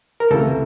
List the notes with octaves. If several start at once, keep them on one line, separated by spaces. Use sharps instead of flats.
A#4
C#2 C3 E3 A3 A4